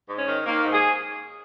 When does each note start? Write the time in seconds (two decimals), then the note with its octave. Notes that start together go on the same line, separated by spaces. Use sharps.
0.09 G#2
0.18 C#4
0.28 D#3
0.46 D#3 A#3
0.64 G#2
0.73 G#4